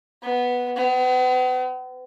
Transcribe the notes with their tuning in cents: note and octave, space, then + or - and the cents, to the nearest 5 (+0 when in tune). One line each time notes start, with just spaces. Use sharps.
B3 -5
B3 +40